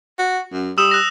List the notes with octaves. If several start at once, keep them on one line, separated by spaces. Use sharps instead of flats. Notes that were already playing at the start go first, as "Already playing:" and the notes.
F#4
F#2
G3 D#6 E6 E7
F#6 A#6